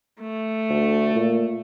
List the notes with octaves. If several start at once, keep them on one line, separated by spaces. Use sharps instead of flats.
A3
D2
A#2